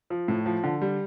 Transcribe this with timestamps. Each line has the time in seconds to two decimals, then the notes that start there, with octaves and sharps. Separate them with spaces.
0.10 F3
0.28 A2
0.46 F3
0.64 D3
0.81 G3